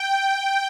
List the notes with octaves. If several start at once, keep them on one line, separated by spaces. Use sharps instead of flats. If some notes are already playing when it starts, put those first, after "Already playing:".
Already playing: G5